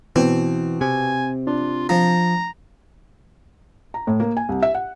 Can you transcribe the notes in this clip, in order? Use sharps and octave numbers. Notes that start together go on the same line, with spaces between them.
B2 E3 C4
C3 G#5
D4 F4
F3 A#5
A#5
A2
A#3
G#5
C2
E5
F#5